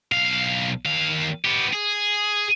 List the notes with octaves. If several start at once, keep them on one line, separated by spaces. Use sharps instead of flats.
B1 F5
D#2 F5
B3 G4
G#4